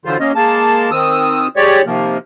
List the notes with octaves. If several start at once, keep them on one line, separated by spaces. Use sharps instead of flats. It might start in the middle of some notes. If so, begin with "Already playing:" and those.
D3 E3 F#3 F4 C5
A#3 C#4 D#5
G#3 A#3 A5
D#3 C4 D#6 E6
G#3 G4 C#5 D5
C3 D#3 F3 A#3